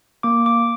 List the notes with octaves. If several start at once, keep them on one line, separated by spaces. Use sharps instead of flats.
A#3 D6
D6